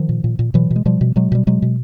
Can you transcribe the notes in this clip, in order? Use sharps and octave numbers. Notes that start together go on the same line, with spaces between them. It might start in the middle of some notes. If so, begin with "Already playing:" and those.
Already playing: D#3 F3
A#2
A#2
A#2
B2 E3 F#3
B2
G#3
B2 F3 G3
B2
B2 F#3 G#3
B2 G3
B2 F#3 G#3
B2